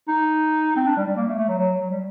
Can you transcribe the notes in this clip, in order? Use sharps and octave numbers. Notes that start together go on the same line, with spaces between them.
D#4
C4
D4
G3
G3
A#3
A3
A3
F#3
F#3
F#3
G3